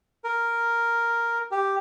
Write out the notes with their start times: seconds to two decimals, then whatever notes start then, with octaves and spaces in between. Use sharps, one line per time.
0.24 A#4
1.51 G4